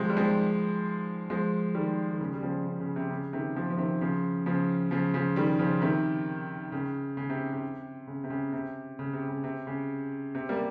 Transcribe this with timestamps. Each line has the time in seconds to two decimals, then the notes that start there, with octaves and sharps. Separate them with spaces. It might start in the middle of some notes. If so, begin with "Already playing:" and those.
Already playing: C3 D#3 F3 G#3
0.09 G3
0.17 F3 G#3
1.30 F3 G#3
1.74 D#3 G3
2.11 D#3
2.21 C#3
2.34 G3
2.42 C#3 F3
2.65 C#3
2.80 C#3
2.96 C3
3.10 C#3
3.33 C3 D#3
3.55 C#3 F3
3.70 F3
3.78 C3 D#3
4.01 C#3 F3
4.46 C#3 F3
4.91 C#3 F3
5.14 C#3 F3
5.36 D#3 G3
5.59 C#3 F3
5.82 C3 D#3
6.72 C#3
7.17 C#3
7.30 C3
7.53 C3
8.07 C#3
8.24 C3
8.30 C#3
8.53 C3
8.99 C#3
9.13 C3
9.28 C#3
9.44 C3
9.67 C#3
10.35 C3
10.49 G3 A#3